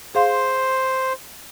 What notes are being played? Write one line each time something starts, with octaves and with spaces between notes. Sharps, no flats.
G#4 C5 F5 C6